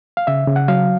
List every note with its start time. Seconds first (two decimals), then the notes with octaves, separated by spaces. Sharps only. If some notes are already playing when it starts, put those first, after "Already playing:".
0.17 F5
0.27 C#3 E5
0.47 C#3
0.56 F#5
0.68 F#3 F5